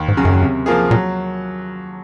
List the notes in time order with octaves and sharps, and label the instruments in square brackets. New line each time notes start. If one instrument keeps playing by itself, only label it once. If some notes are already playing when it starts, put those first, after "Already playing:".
Already playing: [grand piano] D#2
[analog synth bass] G#2
[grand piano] C#3 F#3
[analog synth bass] F#2
[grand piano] C3
F3 A#3 F4 G#4
[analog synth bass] A#2 [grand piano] F#3